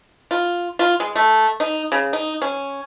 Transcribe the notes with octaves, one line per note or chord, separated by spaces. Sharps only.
F4
F4
G#3
A3
D#4
C#3
D#4
C#4